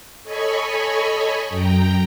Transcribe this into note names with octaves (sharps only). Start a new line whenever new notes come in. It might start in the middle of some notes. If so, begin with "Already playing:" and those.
A4 C#5 D#5 G#5 B5 C#6
F#2 G5 A#5